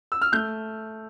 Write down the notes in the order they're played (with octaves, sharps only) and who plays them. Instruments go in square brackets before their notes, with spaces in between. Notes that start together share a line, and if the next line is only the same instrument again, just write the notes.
[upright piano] E6
F6
A3 G6